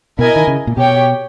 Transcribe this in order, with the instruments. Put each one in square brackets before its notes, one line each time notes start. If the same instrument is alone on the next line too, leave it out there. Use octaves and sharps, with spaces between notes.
[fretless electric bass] B2 [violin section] E4 A#4 D#5 G#5
[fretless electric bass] D#3
C#3
A#2
[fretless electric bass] B2 [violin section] G4 C#5 G5